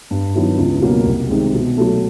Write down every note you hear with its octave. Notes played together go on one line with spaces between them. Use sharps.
G2
D#3 F#3 B3 E4
C#2
B2 F#3 A#3
C2
C3 D#3 G#3
B2
F#3 A3